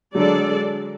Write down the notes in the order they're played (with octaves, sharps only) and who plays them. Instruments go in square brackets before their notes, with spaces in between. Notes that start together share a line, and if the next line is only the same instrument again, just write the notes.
[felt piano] D3 F#3 [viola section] G#3 D4 A4 D5